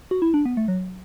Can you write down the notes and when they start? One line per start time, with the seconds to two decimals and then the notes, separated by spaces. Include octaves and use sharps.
0.11 F#4
0.22 E4
0.34 D4
0.46 B3
0.57 A3
0.68 F#3